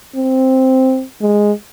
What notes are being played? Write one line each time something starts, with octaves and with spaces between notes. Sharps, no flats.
C4
G#3